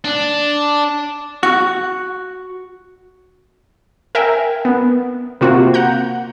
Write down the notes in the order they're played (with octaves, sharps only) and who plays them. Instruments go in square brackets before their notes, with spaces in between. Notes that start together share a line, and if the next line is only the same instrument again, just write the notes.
[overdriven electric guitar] D4
[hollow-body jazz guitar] F#4
[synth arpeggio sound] A#4 E5 G5 G#5
B3
C3 A#3 F4 F#4
F#5 A#5 G6